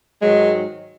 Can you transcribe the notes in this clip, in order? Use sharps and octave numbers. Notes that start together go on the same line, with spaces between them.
G#2 D#3 F#3 G#3